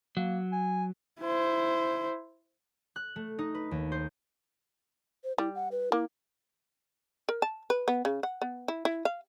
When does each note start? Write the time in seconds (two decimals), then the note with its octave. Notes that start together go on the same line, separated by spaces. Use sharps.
0.17 F#3 A#3
0.52 G#5
1.20 E4 C5
2.96 F#6
3.16 A3
3.39 D#4
3.55 B4
3.71 D#2
3.92 C5
5.24 C5
5.38 G3 E4
5.55 F#5
5.72 B4
5.92 A#3 E4
7.29 A#4
7.42 A5
7.70 B4
7.88 B3
8.05 C#3
8.23 F#5
8.42 B3
8.68 E4
8.85 E4
9.05 F5